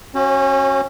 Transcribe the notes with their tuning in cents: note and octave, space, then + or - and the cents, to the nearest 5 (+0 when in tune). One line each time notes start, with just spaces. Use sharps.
C#4 -25 F#4 +0 C5 +45